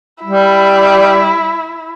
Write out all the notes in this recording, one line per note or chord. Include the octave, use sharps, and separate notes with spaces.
G3 E4